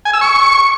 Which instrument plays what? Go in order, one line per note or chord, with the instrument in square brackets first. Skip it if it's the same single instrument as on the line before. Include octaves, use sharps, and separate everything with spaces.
[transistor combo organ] G#5
E6
C#6